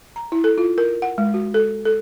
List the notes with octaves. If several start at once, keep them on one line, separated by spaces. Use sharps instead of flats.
A#5
E4
A4
F4
A#4
F#5
G#3
F#4
A4
A4